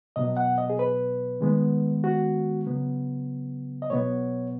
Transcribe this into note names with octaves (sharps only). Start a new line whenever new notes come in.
B2 F#3 B3 D#5
F#5
D#5
G#4
B4
D#3 G#3 B3
F#4
C#3 F#3 B3
D#5
B2 F#3 B3 C#5